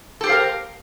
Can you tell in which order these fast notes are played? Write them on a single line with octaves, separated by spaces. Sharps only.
A4 G4 C5 F5 A#4